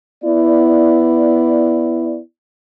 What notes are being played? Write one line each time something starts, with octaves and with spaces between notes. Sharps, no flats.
B3 E4 D5